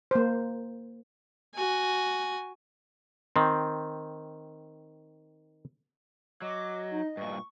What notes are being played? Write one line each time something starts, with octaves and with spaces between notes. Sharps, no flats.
A#3 C5
F#4 G#5
D#3 C4
F#3 D#5 D6
D#4
G2 A#2 C#6